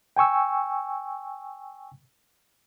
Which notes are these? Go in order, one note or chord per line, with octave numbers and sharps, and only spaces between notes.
G5 G#5 C#6 E6